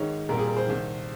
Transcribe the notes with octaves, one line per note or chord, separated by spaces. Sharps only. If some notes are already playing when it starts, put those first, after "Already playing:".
Already playing: G#2 D#3 G#3 C#5
A#2 G3 C4 A#4
G#4
A#4
C5
C2 C3 D#3